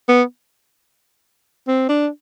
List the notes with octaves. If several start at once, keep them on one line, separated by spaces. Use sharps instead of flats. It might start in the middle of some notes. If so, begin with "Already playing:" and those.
B3
C4
D4